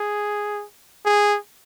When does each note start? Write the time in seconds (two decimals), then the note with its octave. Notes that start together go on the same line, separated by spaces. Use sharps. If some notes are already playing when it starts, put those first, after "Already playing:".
Already playing: G#4
1.06 G#4